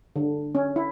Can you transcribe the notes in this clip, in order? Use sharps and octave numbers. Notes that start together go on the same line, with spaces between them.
D3
C#4
E4